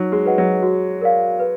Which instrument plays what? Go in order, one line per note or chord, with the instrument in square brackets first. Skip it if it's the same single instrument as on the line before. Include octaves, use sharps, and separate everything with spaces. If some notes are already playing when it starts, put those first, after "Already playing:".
Already playing: [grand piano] F#3 [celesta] D#4
[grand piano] G#3
[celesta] F#4 B4 D#5 F#5
[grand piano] F#3
[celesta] F#4
A#4 D5 F5
B4